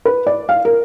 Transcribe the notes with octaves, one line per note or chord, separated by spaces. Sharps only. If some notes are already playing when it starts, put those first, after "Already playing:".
B4
D5
F5
A#4